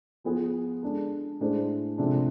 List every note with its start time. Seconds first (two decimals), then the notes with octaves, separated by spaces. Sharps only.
0.24 F3 B3 F4 G#4
0.83 G#3 D4 A4
1.40 A2 G#3 D4 G#4 C5
1.98 C3 F3 G#3 D4 A4